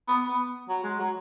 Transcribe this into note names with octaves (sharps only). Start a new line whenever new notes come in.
B3
B3
F#3
G#3
F#3